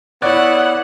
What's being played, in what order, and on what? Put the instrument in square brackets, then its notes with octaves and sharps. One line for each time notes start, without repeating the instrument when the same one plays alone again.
[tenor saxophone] B3 [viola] E4 F#5 [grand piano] C#5 D5 F#6